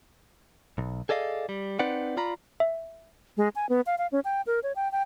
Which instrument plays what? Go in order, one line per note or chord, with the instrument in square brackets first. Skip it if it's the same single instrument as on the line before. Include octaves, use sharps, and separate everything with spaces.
[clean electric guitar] B1
G#4 A4 D5 D#5 F5
G3
C4 D#4 B4 D5 F#5
F4 D5 A#5 B5
[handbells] E5
[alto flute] G#3
G#5
B3
F5
F5
C#4
G5
A#4
C#5
G5
G5